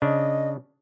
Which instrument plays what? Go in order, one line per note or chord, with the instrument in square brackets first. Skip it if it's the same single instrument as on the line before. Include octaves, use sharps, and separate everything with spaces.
[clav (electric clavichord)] C#3 D4 [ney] D#5